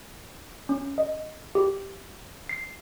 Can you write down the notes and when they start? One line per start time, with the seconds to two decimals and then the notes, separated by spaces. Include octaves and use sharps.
0.69 C#4
0.98 D#5
1.55 G4
2.49 C7